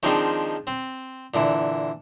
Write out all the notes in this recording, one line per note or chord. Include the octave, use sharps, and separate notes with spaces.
D#3 F3 G#3 C4 D4 D#4
C4
A#2 D3 E3